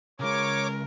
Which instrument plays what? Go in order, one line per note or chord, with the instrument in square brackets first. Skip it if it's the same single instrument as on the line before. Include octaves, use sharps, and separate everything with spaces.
[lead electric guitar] C#3 G#3 [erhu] A#4 [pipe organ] C#5 D6